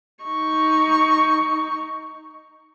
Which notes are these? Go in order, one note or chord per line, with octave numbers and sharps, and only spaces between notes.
D#4 C#6